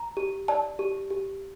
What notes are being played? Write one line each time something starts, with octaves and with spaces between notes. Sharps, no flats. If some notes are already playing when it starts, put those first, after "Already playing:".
Already playing: A#5
G4
D5 A5
G4
G4